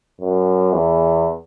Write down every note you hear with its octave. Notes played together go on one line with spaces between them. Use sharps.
F#2
E2